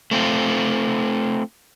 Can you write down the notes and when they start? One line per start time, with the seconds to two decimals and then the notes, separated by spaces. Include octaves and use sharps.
0.11 A3 C4 F4